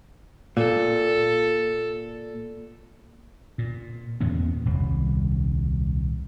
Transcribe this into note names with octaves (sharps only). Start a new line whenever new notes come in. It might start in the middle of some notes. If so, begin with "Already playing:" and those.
A#2 A4
A#2
E2 A#2 B3 C#4
D#1 C2